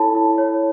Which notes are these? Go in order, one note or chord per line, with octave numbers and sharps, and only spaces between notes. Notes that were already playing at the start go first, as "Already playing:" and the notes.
Already playing: E4 A4 C#5 A5 B5
E4
C#5